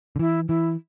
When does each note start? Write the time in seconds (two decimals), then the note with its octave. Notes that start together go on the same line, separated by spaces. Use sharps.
0.16 D3
0.19 E3 E4
0.48 E3 E4